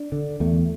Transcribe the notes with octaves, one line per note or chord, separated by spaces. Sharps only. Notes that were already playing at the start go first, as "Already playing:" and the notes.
Already playing: D4
D3
E2 A3